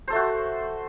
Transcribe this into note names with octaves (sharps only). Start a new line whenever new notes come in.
A3 F#4 A4 C5